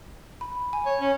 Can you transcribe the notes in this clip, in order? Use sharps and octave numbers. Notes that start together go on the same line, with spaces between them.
B5
G#5
C#5
C#4